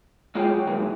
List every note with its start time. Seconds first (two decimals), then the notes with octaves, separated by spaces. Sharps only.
0.35 G#3 F4 G#4 C#5 D#5 G5
0.53 F#3
0.67 A#2 D#3 E3 F#3 G#3 B3